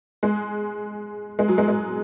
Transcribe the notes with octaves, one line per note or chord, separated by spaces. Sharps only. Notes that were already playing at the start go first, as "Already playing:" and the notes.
G#3
G#3
F#3
G#3
G#3